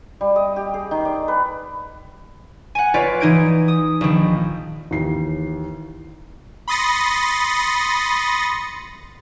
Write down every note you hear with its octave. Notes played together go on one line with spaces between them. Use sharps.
G3
D#5
G4
G#4
D#3
D5
B4
F#5 G#5
F4 B4 C#5 D5
E3 D#4 G#6 D7
D#6
A#1 D#3
D#2 E3 C7
B5 C6 D#6 A6 A#6 C#7